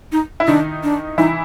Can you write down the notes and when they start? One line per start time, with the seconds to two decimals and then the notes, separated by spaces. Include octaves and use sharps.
0.12 D#4
0.40 E4
0.47 D#3 D4 D#4
0.83 D4
1.18 E3 D#4 E4